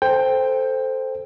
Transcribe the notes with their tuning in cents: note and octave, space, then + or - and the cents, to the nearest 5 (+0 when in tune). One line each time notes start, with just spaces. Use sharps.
A4 +0 C5 -5 G5 +10